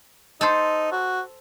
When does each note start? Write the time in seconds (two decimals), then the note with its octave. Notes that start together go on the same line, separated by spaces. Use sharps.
0.41 D#4 A4 C5
0.92 F#4